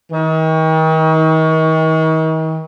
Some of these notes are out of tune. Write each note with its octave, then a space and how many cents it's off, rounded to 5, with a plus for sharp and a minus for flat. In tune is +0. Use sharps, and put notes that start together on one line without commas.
D#3 +40